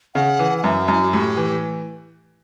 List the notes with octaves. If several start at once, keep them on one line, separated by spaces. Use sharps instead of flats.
C#3 F#5
E3
F#5
F#2 E5
F#2 E4
F#4
A2 G4
E3